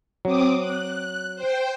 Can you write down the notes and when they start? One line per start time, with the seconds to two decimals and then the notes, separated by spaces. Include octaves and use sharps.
0.25 F#3 C4 D6 D#6
0.60 F#6
1.35 C5 G5